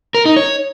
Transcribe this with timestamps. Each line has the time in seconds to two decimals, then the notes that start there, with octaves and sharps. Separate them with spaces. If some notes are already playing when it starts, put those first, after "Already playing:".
0.15 A#4
0.25 D#4
0.36 C#5